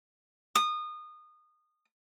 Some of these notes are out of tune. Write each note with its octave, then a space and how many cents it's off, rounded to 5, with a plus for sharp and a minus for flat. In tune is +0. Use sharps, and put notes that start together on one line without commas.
D#6 -25